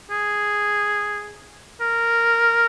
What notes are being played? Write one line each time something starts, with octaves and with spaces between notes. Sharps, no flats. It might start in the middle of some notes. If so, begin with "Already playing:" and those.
G#4
A#4